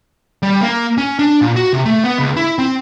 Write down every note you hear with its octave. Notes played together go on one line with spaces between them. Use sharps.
G3
A#3
C#4
D4
A#2
F#4
C3
A3
B3
C#2
E4
C4